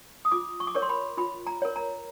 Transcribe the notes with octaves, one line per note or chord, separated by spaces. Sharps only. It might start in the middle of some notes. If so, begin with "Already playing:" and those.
D#6
F4 D6
C#6
D6
A#4 C#5 C#6
C6
B5
F4 B5
A#5
A#4 C#5
A#5